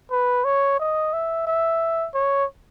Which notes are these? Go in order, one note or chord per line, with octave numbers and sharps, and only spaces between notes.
B4
C#5
D#5
E5
E5
C#5